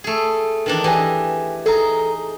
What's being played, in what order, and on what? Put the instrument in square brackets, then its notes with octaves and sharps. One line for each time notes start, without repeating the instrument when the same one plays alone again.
[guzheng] A3 G#4
D#3 E3 D4
[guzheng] E3 G4 D#5 [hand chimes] A4 G#5
[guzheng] D#4 G#4 [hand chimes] A4 A#5